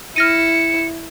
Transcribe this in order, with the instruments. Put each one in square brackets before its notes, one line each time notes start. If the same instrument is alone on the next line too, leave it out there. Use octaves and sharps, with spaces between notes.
[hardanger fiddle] E4 [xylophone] F6 A#6 D#7 [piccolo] C#7